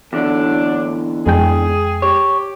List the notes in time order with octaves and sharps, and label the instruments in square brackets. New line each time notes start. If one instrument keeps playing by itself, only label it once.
[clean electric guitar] E2 D3 [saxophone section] A2 F#3 D4
[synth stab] F2 G#3 G5 [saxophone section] G#4
[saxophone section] G4 [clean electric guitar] C#5